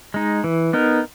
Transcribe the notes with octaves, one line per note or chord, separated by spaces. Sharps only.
G#3 D#4
E3
B3 D#4 A#4